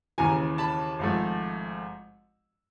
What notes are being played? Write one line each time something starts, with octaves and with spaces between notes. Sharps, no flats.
D#2 C#3 E3 G#5 A#5
A5 B5
G#1 G#2 F3 A3